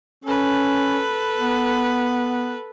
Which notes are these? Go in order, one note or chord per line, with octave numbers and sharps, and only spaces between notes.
C#4 A4 B4
B3